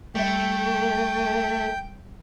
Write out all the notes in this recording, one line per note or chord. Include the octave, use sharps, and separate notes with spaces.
G3 A3 E5 G5